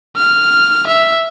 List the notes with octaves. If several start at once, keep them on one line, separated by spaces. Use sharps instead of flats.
F6
E5